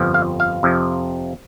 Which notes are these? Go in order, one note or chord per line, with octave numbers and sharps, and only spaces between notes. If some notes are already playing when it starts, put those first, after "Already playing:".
Already playing: G1 F2 F3
F5
F5
F2 C3 F3